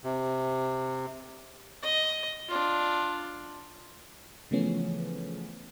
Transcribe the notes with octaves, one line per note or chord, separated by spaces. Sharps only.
C3
D#5
D4 F4
C#3 E3 F3 A3 B3 C#4